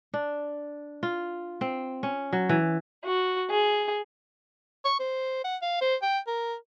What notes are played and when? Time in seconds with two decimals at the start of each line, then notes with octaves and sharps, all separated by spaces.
0.14 D4
1.03 F4
1.61 C4
2.03 C#4
2.33 F#3
2.49 E3
3.04 F#4
3.50 G#4
4.85 C#6
5.00 C5
5.44 F#5
5.62 F5
5.81 C5
6.02 G5
6.27 A#4